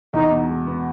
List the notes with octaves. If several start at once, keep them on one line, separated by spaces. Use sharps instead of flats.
E2 D#4
B2
G#3
B3